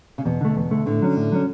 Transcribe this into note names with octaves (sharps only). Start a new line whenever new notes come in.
C#3
E2 B2
D3 A3
E2
D3 A3
A2 D3
F#3 C#4
A2
F#3 C#4